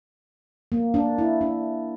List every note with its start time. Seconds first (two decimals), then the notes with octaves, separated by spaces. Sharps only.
0.72 A#3
0.94 D4
1.18 E4
1.41 D4